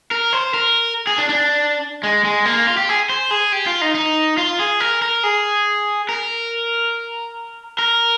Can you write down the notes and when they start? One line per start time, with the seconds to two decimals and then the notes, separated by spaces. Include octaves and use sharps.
0.11 A#4
0.33 C5
0.54 A#4
1.07 G#4
1.18 D4
1.29 D4
2.03 G#3
2.24 G#3
2.46 A#3
2.67 F4
2.77 G4
2.89 G#4
3.10 C5
3.31 G#4
3.52 G4
3.66 F4
3.81 D#4
3.95 D#4
4.38 F4
4.60 G#4
4.80 A#4
5.02 A#4
5.24 G#4
6.09 A#4
7.79 A#4